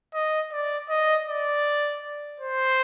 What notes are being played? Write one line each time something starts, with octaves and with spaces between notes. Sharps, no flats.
D#5
D5
D#5
D5
C5